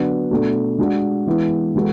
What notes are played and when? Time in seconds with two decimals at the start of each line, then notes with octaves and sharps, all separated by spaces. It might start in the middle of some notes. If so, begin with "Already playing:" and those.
Already playing: D3 F#3 B3 D4
0.31 B2 A3 D4 A4
0.78 G#3 D4 F#4
1.26 E3 G#3 B3 E4
1.74 E3 G#3 B3 F#4 A4